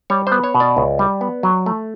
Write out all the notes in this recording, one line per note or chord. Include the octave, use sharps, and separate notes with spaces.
G3 C#5
B3 C5
C#5
B2
D5
C#2
G3
B3
F#3
A3